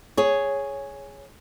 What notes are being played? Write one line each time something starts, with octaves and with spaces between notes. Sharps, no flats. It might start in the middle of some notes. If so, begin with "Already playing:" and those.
G#4 C#5